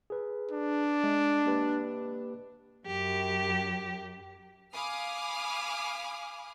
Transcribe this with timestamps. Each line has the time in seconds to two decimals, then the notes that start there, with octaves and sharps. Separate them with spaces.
0.10 G#4 B4
0.51 D4
1.04 G#3
1.46 A#3 G4 B4
2.85 F#2 G4
4.73 F5 G#5 B5 D6 D#6 F6